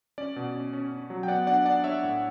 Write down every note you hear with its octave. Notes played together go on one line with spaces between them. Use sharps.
C#4 D5
B2
C#4
C#4
C#4
F#3
G5
B3 D5 F#5
D4 D5 F#5
D4 D5 F#5
D4 C#5 E5
A2